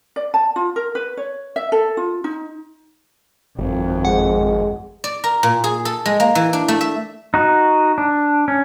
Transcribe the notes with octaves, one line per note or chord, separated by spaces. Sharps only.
D5
A5
F4
A#4
B4
C#5
E5
A4
F4
D#4
G#1 F2
G#3 F#5
D5
A#4
A#2
G#4
A4
G#3
A#3
E3
D4
A3
E5
D#4 F#4
D4
C#4